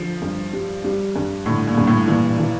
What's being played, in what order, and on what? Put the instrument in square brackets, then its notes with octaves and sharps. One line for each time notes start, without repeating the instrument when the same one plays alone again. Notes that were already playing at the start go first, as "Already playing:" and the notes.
Already playing: [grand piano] D3 [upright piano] F3
[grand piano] G2
G3
G3
G2
[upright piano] A2 [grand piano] D3
[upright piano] A#2
[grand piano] G2
[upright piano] A2
[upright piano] A#2 [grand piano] E3
[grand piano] E3